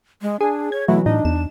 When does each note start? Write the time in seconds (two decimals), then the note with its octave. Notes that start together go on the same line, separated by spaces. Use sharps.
0.22 G#3
0.41 D4 G#4
0.72 C#5 G#6
0.88 B2 E3 F#3 A3 E4
1.06 A2 D4 D#4
1.25 E2 E7